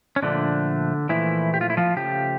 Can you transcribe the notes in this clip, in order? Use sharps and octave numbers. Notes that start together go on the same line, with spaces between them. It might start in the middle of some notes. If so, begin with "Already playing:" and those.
C#4
A#2 D3 F3 A3 D4
A#2 E3 F3 A3 E4
G4
F4
E4
F3 F4
C#3 F3 A3 G4